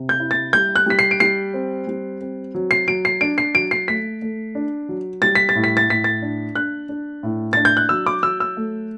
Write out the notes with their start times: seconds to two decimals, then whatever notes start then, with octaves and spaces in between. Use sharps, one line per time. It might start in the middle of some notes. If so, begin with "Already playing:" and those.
Already playing: C3
0.09 G6
0.20 E4
0.31 A6
0.53 G3 G6
0.76 F#6
0.86 G3 B6
0.99 C7
1.11 D7
1.20 G3 C7
1.54 C4
1.87 G3
2.21 C4
2.55 F#3
2.71 C7
2.88 F#3 D7
3.05 C7
3.21 D4 D7
3.38 C7
3.55 F#3 D7
3.71 C7
3.88 A3 B6
4.22 A3
4.55 D4
4.89 F#3
5.22 G3 A6
5.35 B6
5.49 A6
5.55 A2
5.64 B6
5.77 A6
5.89 A2 B6
6.04 A6
6.22 D4
6.55 D4 F#6
6.89 D4
7.23 A2
7.53 D4 A6
7.65 G6
7.77 F#6
7.89 F#3 E6
8.06 D6
8.23 F#3 E6
8.40 E6
8.57 A3